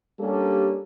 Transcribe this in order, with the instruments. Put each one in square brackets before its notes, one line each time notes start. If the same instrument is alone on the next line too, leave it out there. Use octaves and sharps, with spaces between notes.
[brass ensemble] G3 A#3 C#4 D4 G4 A4